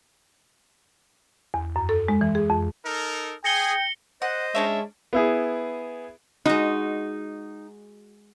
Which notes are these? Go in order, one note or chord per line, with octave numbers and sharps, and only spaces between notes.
E2
F#2
A4
G#3
E3
G#4
F2
D#4 A4 A#4
G#4 G5 A#6 C#7 G7
C5 D#5 F#5
G#3 C#4 D4 C#5 E5
B3 E4 G#4
G#3 D#4 F#4